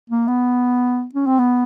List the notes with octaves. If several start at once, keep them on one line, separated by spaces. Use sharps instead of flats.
A#3
B3
C#4
C4
B3